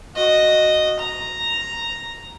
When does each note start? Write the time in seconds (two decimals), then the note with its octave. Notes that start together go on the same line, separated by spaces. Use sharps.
0.16 F#4 D#5
0.99 A#5